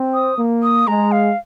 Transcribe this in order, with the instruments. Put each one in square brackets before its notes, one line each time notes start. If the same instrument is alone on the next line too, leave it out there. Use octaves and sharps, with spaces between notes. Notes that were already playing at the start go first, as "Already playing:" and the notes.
Already playing: [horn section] C4
[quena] D#6
[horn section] A#3
[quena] D#6
[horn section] G#3 [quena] A#5
[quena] F5